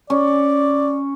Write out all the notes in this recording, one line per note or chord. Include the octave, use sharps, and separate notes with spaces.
C#4 D5